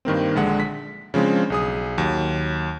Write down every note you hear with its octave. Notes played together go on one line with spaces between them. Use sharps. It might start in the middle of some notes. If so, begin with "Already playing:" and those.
G2 D#3 A#3 C4
A#1 D3 G#3 F#5
B6
C#3 F3 G#3 C4 D4
B1 G#4 D#6
D#2 F#3